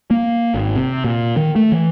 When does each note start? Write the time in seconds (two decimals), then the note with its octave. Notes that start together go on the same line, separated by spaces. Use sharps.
0.11 A#3
0.54 G#1
0.76 C3
1.04 A#2
1.37 D#3
1.56 A3
1.72 E3